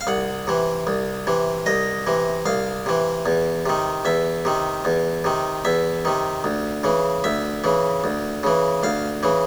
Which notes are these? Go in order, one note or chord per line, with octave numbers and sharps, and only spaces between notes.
F5
C2 F#5
C3 E3
C2
C3 E3
C2 D#5
C3 E3
C2 F5
C3 E3
E2
C3 D#3
E2 E5
C3 D#3
E2
C3 D#3
E2 E5
C3 D#3
D2
C#3 E3
D2 E5
C#3 E3
D2
C#3 E3
D2 F5
C#3 E3